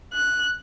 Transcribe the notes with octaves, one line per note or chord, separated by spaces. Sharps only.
F#6